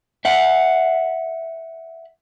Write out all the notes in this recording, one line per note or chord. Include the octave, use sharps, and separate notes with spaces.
E5 F#5